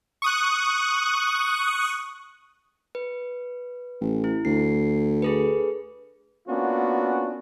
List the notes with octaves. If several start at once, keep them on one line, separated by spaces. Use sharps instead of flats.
C#6 D#6 F#6
B4
A1
E4
D2 C7
G#4 A4 B4
A#3 B3 C#4 D4 F4 F#4